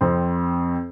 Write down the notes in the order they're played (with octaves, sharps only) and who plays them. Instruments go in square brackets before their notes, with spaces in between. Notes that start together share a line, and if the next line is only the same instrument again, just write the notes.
[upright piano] F2 C4